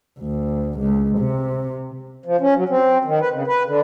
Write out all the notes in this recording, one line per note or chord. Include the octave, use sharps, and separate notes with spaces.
D2
C#2
C3
F3
C#4
F#3
C4
D#3
B4
C#3
B4
D3